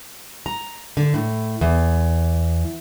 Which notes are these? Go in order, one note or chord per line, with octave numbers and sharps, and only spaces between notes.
A#5
D3
A2
E2